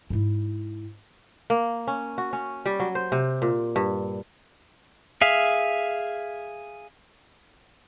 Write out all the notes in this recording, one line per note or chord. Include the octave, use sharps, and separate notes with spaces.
G#2 E4
A#3
C#4
F#4
C#4
G3
F#3
C5
C3
A#2
G2
G#4 E5 F5